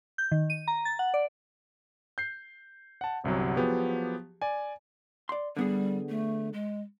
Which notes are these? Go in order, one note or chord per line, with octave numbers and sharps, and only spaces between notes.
G6
D#3
D#7
A#5
A6
F#5
D5
G6 C7
F#5 A5
G1 C2 C3 F#3
F3 F#3 B3 G4 G#4
D5 G#5
D5 C6
D3 G3 B3 G#4
A3
G#3